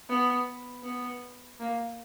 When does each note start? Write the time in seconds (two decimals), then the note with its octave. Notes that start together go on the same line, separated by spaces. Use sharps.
0.09 B3
0.84 B3
1.60 A#3